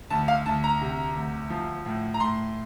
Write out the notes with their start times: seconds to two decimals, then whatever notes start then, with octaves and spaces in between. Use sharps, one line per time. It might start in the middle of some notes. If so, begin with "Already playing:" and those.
0.10 D2 A5
0.28 F5
0.46 D2 A5
0.64 A#5
0.82 C3
1.16 D2
1.50 F3
1.86 A2
2.14 A#5
2.20 A2 C6